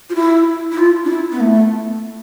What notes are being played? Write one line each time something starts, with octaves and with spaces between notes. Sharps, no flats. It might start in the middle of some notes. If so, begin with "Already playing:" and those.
F4
E4
E4
F4
D4
E4
B3
A3